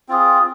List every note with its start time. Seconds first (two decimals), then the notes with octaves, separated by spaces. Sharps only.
0.08 C4 F4 G#4